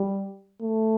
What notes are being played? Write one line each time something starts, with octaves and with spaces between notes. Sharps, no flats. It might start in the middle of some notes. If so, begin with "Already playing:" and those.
Already playing: G3
A3